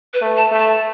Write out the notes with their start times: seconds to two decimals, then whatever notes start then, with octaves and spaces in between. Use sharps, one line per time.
0.14 B4
0.21 A3
0.37 A5
0.52 A3
0.59 A5